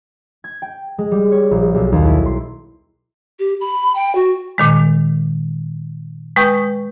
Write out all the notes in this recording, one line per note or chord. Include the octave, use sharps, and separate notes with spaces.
G#6
G5
G#3
G3
C#5
A#1
B1
D#2
E4
C6
G4
B5
G5
F#4
A#2 D#3 G#3
G#3 B4 G5 C#6 D#6 G6